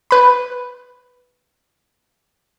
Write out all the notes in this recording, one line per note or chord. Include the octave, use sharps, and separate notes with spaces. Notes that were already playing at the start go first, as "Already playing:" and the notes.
B4 B5